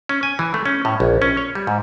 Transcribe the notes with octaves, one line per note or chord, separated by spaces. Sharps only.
C#4
G#5
E3
A3
C#4
A2
A#1
C#4
C#5
G3
G#2